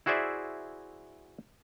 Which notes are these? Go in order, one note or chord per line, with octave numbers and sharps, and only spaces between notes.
E4 F#4 G#4 C5 D5 E5